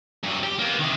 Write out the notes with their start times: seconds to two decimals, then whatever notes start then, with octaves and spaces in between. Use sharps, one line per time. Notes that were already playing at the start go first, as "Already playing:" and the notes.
0.24 G2 F#3
0.43 G4
0.59 A#3 B3
0.79 C3 D#3